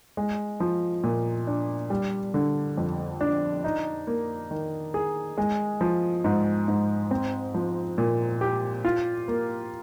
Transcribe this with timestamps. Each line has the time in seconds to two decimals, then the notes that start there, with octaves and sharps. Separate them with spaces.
0.17 G#3
0.60 F3
1.04 A#2
1.47 D4
1.90 G3
2.34 D3
2.77 F2
3.21 D4
3.64 D#4
4.07 A#3
4.51 D#3
4.94 G#4
5.38 G#3
5.81 F3
6.24 G#2
6.68 G#2
7.11 C4
7.54 F3
7.98 A#2
8.41 G4
8.85 F4
9.28 A#3